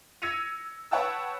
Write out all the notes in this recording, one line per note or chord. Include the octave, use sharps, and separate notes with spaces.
E6 G#6 A#6 C#7 D#7 F7
B4 C#5 F#5 G5 A5 E6